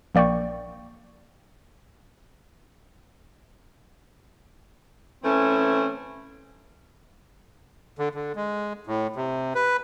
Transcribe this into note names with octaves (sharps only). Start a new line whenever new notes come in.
A#1 A#3 D5 G5 C#6
E3 A3 C4 C#4
D3
D3
G#3
A2
C3
B4